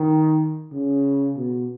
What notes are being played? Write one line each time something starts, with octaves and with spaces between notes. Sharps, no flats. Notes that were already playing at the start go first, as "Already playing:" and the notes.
Already playing: D#3
C#3
B2